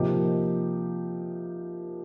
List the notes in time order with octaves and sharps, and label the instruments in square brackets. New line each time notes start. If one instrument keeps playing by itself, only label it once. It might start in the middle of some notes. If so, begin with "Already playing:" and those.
Already playing: [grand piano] C3 F3 A#3 D#4 G4